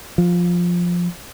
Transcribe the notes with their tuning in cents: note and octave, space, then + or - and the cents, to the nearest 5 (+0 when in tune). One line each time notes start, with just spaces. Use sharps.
F3 +5